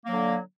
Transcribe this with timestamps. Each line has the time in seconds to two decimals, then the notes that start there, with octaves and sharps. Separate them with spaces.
0.05 A#3
0.09 F#3
0.12 D3